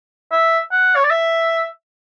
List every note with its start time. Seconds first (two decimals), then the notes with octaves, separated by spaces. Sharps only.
0.31 E5
0.71 F#5
0.96 C#5
1.04 D5
1.10 E5